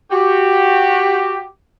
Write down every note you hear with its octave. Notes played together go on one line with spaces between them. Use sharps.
F#4 G4